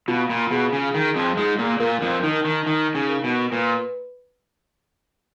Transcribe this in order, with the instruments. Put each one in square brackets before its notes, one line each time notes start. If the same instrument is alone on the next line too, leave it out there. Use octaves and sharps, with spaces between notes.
[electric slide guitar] B2 [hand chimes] F4
[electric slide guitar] A#2
[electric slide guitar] B2 [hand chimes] G#4
[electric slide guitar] C#3
[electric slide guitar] D#3 [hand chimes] G#4
[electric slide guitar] F2 F3
[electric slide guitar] G#2 G#3 [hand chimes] F4
[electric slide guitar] A#2 A#3
[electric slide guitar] A#2 A#3 [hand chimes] A#4
[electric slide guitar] F2 F3
[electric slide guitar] D#3 [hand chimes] D#4
[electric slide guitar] D#3
[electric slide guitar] D#3 [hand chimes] D#4
[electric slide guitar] C#3
[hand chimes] A#4
[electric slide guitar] B2
[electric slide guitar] A#2 [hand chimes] B4